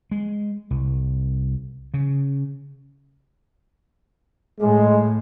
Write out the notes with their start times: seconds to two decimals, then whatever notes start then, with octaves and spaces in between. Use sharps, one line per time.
0.11 G#3
0.71 C2
1.94 C#3
4.60 A2 G#3